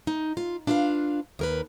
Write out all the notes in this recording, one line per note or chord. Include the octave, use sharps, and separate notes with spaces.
D#4
F4
D4 E4 F4 B4 F5
D#2 A#4 B4